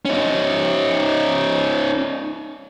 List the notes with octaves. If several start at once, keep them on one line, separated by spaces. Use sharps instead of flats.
C#4 D#4